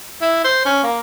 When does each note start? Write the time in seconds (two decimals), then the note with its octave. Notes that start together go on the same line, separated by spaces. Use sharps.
0.22 E4
0.45 C5
0.66 C#4
0.84 A#3